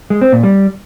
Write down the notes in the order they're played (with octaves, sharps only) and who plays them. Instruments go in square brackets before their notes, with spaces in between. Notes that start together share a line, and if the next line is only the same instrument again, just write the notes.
[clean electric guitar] G#3
C4
A#2
G3